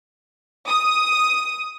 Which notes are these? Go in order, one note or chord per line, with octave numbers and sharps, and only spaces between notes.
D#6